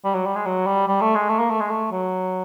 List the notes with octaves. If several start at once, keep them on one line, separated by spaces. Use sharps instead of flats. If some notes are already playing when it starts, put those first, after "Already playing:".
G3
F#3
G3
G#3
F#3
G3
G3
A3
G#3
A3
A#3
A3
G#3
A3
F#3